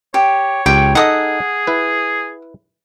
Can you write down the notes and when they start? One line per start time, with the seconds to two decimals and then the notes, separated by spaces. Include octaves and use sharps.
0.14 G4 C#5
0.66 C#2 G4 G5
0.95 D#4 G#4 A4 D#5 F#5 D#6
1.67 E4 B4